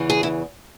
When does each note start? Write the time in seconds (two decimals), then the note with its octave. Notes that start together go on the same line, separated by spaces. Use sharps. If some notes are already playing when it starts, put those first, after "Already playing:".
Already playing: E2 C#3 E3
0.10 G#4
0.23 E4